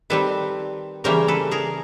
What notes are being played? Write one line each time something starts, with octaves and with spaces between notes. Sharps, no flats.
D#3 G3 C4 A4 B4
C#3 E3 G3 A#3 C#4 A#4 C5
A4 B4
G#4 A#4